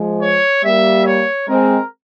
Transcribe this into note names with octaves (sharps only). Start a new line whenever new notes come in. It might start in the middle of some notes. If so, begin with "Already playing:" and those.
Already playing: F3 G#3
C#5
G3 A#3 E5
C#5
G#3 C4 A#4